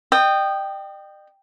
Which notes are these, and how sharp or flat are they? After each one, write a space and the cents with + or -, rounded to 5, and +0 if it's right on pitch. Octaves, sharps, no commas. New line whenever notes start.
D#5 -45 G5 +0 D#6 -15